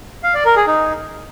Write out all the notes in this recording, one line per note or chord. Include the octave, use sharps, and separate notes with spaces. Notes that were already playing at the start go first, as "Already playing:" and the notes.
F5
D5
A#4
G#4
D#4